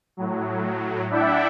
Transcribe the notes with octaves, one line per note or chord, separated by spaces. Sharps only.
A2 F#3
D4 E4 D5 E5 F#5 G5